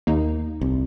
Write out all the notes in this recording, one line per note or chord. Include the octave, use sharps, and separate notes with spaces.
D#2 A#3 D#4
C2